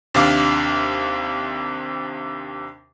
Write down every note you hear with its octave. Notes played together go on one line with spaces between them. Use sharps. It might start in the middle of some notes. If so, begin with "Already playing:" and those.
D#2 C3 D4 F5 D6